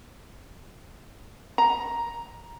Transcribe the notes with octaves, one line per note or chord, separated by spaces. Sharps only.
A#5